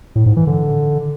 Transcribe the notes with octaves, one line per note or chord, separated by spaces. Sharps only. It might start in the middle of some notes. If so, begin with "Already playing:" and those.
A2
G#2
E3
D3